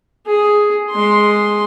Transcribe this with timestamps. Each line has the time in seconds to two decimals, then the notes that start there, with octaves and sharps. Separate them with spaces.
0.26 G#4
0.91 G#3 C6